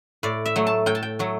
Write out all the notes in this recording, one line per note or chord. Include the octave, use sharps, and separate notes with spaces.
A2 D5
E5
F#3 A3
A5
A2 G5
A5
G5
F#3 A3